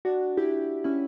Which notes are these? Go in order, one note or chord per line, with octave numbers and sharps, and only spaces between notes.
D4 F#4
E4 G4
C#4 E4